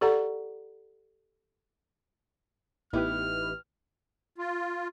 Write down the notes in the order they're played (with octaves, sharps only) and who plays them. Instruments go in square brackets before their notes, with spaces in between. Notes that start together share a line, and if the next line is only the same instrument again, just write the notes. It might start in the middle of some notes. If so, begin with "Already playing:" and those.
[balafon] G4 A4 D5 F#5 A#5
[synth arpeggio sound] A1 G4 B4 [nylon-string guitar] B3 D#4 E4 [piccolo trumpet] F6
[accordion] F4